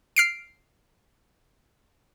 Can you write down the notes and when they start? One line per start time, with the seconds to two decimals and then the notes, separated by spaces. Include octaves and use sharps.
0.16 F6 C7 D7